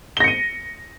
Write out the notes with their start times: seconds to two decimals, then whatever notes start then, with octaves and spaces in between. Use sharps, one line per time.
0.17 G7
0.20 A#6
0.24 C#7
0.28 D#7